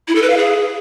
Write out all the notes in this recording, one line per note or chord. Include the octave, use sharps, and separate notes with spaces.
E4
A4
B4
F5
G#4